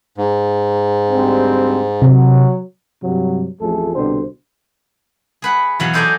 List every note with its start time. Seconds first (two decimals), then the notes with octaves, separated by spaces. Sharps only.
0.18 G#2
1.10 D2 G3 C4
2.02 C3 F#3
3.02 G2 C3 F#3
3.60 A1 F2 F3 A3 G#4 A4
3.94 C2 B2 D3 C4 D4 C5
5.42 G#4 B4 F#5
5.80 E2 B2 F#3 F5 F#5 G#5
5.93 D#4 A4 C5 D5 D#5 G#5